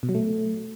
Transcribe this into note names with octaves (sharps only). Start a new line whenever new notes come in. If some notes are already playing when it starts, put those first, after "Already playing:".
B2
F#3
A3